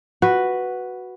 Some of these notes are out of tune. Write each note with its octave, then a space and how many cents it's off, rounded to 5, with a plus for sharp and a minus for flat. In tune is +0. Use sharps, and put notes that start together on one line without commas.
F#4 +0 B4 +0